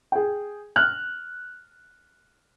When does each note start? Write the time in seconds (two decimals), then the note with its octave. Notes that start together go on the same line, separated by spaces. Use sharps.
0.12 G#4 G5
0.76 F6 F#6